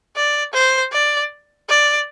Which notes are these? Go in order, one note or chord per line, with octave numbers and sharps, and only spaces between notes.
D5
C5
D5
D5